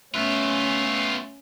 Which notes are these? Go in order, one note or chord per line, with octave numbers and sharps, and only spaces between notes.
A3 B3 C#4 F4 B4 E5